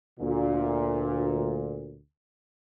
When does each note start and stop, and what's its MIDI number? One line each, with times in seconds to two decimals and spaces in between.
0.20 1.98 38
0.20 1.98 46